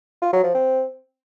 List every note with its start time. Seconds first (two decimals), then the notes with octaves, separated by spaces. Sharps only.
0.22 F4
0.33 F#3
0.44 F3
0.55 C4